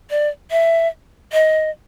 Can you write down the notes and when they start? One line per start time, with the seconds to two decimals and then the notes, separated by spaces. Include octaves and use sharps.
0.10 D5
0.51 E5
1.33 D#5